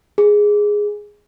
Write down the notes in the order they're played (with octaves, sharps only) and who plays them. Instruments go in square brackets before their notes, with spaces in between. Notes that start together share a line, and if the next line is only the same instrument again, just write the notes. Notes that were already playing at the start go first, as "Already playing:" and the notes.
[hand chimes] G#4